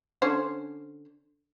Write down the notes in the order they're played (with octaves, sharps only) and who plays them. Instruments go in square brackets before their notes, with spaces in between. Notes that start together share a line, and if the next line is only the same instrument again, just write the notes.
[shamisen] D3 C#4 C5